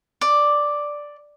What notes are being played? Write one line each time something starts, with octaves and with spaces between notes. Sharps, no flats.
D5